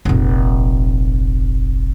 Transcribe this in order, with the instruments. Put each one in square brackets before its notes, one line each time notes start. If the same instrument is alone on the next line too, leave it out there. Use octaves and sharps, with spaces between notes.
[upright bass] F1 A#1